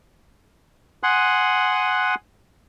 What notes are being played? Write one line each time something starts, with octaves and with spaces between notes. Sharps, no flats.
F#5 G#5 C6 D#6 F#6